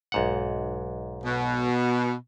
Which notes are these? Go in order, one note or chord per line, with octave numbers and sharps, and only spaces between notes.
B1 G#2 F#5
B2